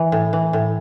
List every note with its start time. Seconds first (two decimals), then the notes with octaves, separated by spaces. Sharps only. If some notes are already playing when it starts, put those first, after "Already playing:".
Already playing: E3
0.12 A2
0.33 E3
0.53 A2